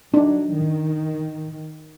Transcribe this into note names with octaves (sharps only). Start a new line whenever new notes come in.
F#3 D4 D#4
D#3